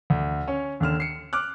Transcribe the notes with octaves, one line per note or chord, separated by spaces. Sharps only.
D2
C#4 C#5
D#2 D3 F6 E7
C7 C#7
D6 F6 F#6